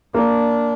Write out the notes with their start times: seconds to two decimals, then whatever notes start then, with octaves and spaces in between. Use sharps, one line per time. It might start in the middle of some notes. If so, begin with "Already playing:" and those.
0.14 A#3 D4